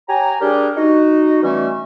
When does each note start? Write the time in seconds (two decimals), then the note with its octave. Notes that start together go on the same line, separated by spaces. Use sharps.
0.08 G4 C#5 G#5 A#5
0.40 G3 D4 G4 G#4 A#4
0.76 D#4 F#4
1.42 B2 E3 G3 A3 C#4